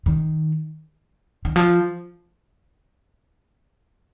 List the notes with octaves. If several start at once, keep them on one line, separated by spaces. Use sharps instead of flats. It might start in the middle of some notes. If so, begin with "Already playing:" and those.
D#3
D#3
F3